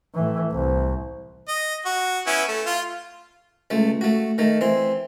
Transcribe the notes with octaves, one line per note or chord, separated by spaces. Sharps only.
A2 E3
C2
D#5
F#4
B3 C#4 E4
A3
F4
C#2 A3
A3 F#4
D#3 A3
E3 C4